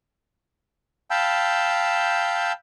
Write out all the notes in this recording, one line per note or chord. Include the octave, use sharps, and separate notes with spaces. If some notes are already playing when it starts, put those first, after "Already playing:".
F5 G5 A5 B5 E6 G6